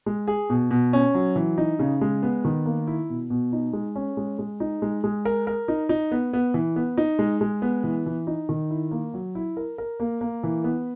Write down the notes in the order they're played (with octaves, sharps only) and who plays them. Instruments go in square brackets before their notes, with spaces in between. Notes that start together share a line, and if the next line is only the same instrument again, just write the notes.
[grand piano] G#3
G#4
B2
B2
C#4
F#3
E3
D#4
C#3
G#3
B3
D#3
A#3
E4
B2
B2
D#4
G#3
C#4
G#3
G#3
D#4
G#3
G#3
A#4
A#4
D#4
D#4
B3
B3
E3
B3
D#4
G#3
G#3
B3
E3
E3
D#4
D#3
E4
A#3
F#3
E4
A#4
A#4
A#3
A#3
E3
B3